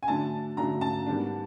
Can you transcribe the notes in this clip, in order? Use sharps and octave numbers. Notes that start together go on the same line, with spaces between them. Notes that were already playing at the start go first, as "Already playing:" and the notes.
G#5
D3 F#3 A3 D4 A5
D3 F#3 A3 D4 A#5
A5
G#2 D#3 G3 B3 D4